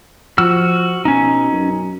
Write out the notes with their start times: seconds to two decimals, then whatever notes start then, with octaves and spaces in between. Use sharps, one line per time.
0.38 F3 F#4 E6 F6
1.05 B2 C#4 D#4
1.52 F#2